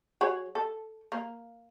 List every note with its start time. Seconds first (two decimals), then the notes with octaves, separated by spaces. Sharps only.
0.21 F#3 G#4 C#5
0.55 A4
1.12 A#3